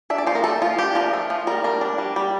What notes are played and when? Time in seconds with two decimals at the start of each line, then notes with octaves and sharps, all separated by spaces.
0.10 D4 E5
0.18 D5
0.27 F3 C5
0.35 A#4
0.44 A3 A4
0.62 F3 F4
0.78 D4 G4
0.95 F3 A#4
1.13 A3
1.30 F3
1.47 G3 A#4
1.64 D4 A#4
1.81 D4
1.98 G3
2.16 G3